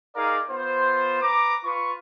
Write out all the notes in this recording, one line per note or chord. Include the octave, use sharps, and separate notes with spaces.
D#4 G#4 A#4 D5 F5
B3 F4 C5
B4 A#5 D6
F4 B4 C#6